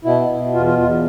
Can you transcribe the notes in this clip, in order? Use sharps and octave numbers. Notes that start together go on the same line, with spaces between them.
B2 E4
B2
E2 F4
F4
E2 F4